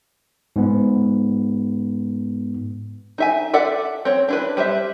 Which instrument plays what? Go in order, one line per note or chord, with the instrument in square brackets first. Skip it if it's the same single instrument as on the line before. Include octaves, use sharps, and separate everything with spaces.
[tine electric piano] G#2 B3
[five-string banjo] D#4 E5 G#5
A4 D5 E5 F#5
C4 C#5
D4 E4 B4
G3 B4 C5 D#5 E5